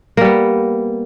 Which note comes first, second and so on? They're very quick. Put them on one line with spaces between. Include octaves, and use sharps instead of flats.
A#3 G3 B3